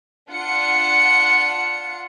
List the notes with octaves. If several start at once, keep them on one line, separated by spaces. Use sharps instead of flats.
D4 F4 F#5 C#7